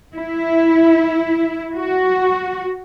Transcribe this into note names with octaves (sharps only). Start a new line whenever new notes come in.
E4
F#4